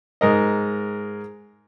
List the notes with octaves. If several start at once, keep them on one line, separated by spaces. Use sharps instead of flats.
G#2 A#4 D#5